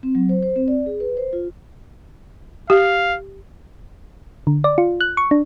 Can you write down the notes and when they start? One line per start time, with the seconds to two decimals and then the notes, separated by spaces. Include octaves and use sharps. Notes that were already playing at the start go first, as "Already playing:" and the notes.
0.03 C4
0.15 F#3
0.29 C5
0.42 C5
0.56 C4
0.68 D5
0.86 G#4
1.00 B4
1.17 C5
1.33 F4
2.70 G4 F5
4.47 D3
4.64 D5
4.78 F4
5.01 F#6
5.17 C#6
5.31 D4